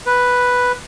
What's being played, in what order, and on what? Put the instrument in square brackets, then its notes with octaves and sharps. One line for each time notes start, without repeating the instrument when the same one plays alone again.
[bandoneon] B4